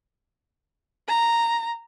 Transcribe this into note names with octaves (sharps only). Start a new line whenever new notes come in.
A#5